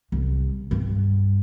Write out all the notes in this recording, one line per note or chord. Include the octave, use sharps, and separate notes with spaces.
C2
G2